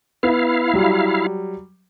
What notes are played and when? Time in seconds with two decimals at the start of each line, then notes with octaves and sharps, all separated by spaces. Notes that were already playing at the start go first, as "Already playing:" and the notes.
0.23 B3 E4 F5
0.74 F#3 G3